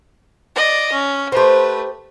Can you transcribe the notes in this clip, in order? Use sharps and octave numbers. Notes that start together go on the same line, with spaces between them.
D5 D#5
C#4
A3 G4 B4 C5